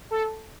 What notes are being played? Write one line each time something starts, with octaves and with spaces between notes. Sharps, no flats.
A4